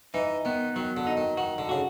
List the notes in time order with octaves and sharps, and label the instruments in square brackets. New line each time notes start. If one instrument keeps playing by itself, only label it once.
[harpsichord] E3 [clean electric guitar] D#4
[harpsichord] D#3 [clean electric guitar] B3
[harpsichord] D#3 [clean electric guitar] F#3
[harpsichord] D3
[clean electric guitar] D#4
[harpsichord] D#3
[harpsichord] D#3 [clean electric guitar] F#4
[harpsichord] D3
[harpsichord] C#3 [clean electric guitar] F#4